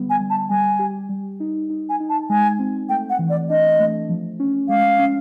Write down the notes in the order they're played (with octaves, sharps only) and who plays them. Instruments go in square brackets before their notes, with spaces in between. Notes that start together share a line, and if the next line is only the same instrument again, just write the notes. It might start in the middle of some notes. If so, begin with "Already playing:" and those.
Already playing: [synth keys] D3 G3 B3
[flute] G#5
[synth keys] G3
[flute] A5
[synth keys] G3 [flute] G#5
[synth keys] G4
G3
D#4
D#4
[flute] G#5
[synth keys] D#4
[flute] A5
[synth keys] G#3 [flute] G#5
[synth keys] C4
[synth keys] A3 [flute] G5
[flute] F#5
[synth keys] E3
[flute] D5
[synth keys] D4 [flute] D#5
[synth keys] A3
F3
C#4
[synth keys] G#3 [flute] F5
[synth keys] C#4